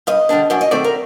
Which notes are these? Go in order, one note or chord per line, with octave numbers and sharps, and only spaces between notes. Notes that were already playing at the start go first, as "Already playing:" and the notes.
G2 D#5
D3 G3 D4
F#2 D5
D#5
D#3 A3 C4 D5
A#4